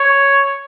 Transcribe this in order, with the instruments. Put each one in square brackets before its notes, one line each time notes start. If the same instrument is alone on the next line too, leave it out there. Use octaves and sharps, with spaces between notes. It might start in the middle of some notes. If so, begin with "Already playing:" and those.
Already playing: [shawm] C#5